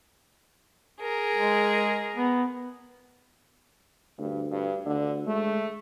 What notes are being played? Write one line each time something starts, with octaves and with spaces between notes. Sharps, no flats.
G#4 A#4
G#3
B3
D2 G2
G2
D2 D3
G#3 A3